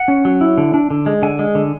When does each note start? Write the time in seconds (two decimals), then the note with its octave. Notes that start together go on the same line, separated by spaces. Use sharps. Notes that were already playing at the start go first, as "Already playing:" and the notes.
Already playing: F#5
0.08 C#4
0.25 F#3
0.41 E4
0.58 D3
0.74 D4
0.90 D3
1.06 G#3
1.22 D3 G#5
1.39 G#3
1.55 D3